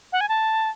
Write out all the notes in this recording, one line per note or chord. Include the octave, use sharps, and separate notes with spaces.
F#5
G#5
A5